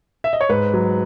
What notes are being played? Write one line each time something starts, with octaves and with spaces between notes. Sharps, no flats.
E5
D#5
C#5
G#2 B4
F#3